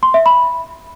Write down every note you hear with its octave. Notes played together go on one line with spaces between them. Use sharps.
C6
E5
B5